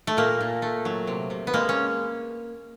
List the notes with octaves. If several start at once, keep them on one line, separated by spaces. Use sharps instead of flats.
A3
A#2 A#3
A#2
A3
F#3
C3
C3
B3
G#3 A#3
C#4